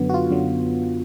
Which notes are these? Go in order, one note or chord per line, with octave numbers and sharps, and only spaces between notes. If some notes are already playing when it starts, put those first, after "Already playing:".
Already playing: F#2 D3 F#3 B3
F#4
F4
F#2 D3 F#3